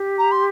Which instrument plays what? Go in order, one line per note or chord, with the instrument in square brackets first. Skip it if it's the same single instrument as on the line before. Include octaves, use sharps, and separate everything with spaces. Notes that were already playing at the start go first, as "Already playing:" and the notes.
Already playing: [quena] G4
[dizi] A#5
C6